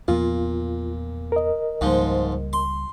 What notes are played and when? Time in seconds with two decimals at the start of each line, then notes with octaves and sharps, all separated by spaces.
0.08 E2 A#2 F3 B3 F4
1.32 A#4 D#5
1.81 C#2 G#2 F3 G3 A#3
2.53 C6